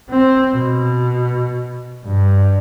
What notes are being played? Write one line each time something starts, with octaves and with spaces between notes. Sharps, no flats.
C4
B2
G2